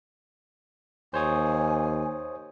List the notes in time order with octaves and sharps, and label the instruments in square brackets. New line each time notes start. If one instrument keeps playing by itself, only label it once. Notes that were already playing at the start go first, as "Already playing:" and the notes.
[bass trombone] D#2 [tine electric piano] C5 C#5 D#6 [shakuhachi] G#5